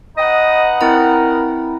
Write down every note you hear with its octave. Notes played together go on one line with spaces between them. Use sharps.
D#4 B4 D#5 F#5
C4 E4 A#4 A#5